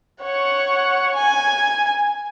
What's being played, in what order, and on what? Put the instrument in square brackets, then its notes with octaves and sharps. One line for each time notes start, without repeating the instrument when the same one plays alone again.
[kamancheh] C#5 F#5
G#5